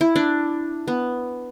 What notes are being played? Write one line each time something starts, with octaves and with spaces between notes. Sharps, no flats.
E4
D4
B3